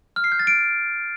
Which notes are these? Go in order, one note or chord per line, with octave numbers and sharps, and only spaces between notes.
F6
C7
G6
A6
D7